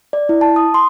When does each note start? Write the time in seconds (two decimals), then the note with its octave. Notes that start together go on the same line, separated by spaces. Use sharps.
0.13 D5
0.29 E4
0.41 A5
0.56 D#6
0.74 C6